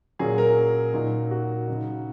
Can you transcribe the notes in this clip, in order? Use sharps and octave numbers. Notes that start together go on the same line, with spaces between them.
A#2 F#3 C#4 G#4
A#4
A#2 F#3 D#4
F#4
C#3 F#3 D#4